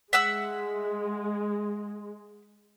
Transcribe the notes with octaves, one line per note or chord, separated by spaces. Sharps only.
G#3 E5 F#5 E6